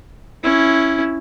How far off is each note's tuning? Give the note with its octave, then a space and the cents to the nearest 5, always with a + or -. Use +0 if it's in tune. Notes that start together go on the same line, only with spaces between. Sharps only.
C#4 +0 E4 +0